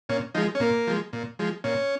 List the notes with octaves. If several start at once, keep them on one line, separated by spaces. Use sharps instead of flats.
A#2 C#4
F3 G#3 D#4
C#4
A#2 A#3
F3 G#3
A#2
F3 G#3
A#2 C#4